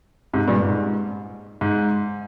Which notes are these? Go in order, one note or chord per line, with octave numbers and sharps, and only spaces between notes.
G#2 C3
G2 A#2
G#2
G#2